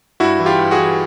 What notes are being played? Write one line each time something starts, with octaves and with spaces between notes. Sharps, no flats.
G2 E4 F#4
E3
F4 G4
G2
F#4 G#4
E3